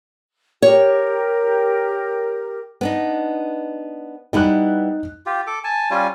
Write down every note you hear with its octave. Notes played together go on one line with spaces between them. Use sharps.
G4 A#4 C#5 G5
B3 D4 D#4
G3 B3 D#4 E4 F#6
F4 G4
A4 D6
G#5 A5
G3 C#4 F4 G#5